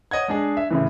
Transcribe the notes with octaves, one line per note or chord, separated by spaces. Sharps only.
C#5 D#5 F#5 G#6
G#3 D4 G#4
E5
A2 C#3 E3